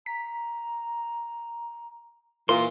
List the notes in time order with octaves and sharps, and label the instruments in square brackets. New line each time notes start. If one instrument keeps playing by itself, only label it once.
[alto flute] A#5 [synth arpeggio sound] B6
[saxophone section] A#2 E3 F4 [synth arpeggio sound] A#4 [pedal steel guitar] C6